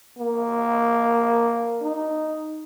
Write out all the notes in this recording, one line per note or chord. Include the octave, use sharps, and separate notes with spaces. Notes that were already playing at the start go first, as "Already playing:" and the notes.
A#3
D#4